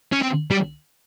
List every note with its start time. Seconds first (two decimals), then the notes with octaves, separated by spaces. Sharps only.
0.13 C#4
0.22 C4
0.51 G3